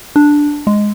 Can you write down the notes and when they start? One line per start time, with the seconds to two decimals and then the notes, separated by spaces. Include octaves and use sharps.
0.16 D4
0.67 G#3